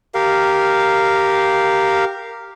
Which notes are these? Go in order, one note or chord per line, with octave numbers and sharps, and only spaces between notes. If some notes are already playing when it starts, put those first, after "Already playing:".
G4 A#4 F5